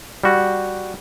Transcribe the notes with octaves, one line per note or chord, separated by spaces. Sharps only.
G3 F#4